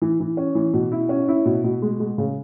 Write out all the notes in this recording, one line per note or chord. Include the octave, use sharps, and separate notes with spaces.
E3
E3
C#4
E3
B2
E4
C#4
E4
B2
B2
G#3
G#3
C#3